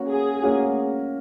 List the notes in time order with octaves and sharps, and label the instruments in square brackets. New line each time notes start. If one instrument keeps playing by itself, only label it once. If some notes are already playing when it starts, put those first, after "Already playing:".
Already playing: [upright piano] A#3 C#4 F#4
[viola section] G#4
[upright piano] A#3 C#4 F#4